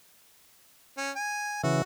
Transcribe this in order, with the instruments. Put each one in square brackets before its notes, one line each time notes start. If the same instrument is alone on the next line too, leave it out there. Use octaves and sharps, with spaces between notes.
[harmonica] C#4
G#5
[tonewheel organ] C#3 E3 [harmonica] F#4